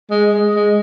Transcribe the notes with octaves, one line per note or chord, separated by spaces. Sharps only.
G#3
G#3
G#3